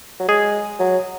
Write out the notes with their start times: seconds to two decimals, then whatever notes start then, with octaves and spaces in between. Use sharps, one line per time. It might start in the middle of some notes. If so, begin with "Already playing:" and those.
0.19 F#3
0.28 G#3 G#4
0.79 F#3